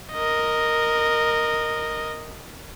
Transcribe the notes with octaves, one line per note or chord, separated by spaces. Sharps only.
A#4 D#5